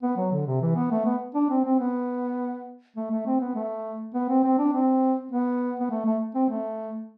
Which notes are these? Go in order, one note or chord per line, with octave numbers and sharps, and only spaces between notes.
B3
F#3
D3
C3
E3
B3
A3
B3
D4
C4
C4
B3
A3
A3
C4
B3
A3
B3
C4
C4
D4
C4
B3
B3
A3
A3
C4
A3